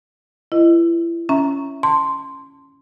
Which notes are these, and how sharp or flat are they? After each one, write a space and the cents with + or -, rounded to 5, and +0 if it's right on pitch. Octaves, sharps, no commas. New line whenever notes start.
E4 +35 B4 -15 D#5 +0
C#4 +0 E5 -5 A#5 -5
A5 +30 C6 +0